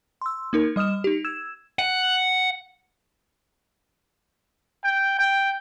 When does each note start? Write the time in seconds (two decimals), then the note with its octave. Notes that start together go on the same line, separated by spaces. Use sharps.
0.21 C6 E6
0.53 A#3 D#4 A#4
0.76 G3 D#5 D#6 F6 E7
1.04 D#4 G4
1.24 E6 G#6 E7
1.79 F#5
4.84 G5
5.19 G5